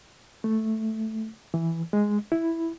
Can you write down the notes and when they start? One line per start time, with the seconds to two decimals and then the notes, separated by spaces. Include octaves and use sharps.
0.44 A3
1.54 E3
1.93 G#3
2.32 E4